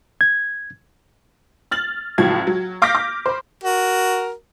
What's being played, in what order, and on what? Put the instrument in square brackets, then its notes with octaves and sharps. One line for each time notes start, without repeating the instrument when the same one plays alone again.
[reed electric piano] G#6
[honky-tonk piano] F6 A6 F#7
C#2 A2 F3 F#3 G#6
F#3
F5 D6 F6 G6 A#6 B6
D6
C5 B5
[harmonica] F#4 A#4